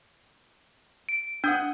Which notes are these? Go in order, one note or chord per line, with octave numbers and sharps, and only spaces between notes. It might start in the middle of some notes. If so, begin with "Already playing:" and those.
D7
D4 F#5 D#6 G6